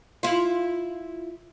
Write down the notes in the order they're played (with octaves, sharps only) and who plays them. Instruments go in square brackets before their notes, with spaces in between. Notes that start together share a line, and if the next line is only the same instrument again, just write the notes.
[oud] E4 F4